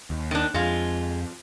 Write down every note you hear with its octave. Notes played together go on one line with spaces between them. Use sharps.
D#2
D#3 D4
F2 G#3 F4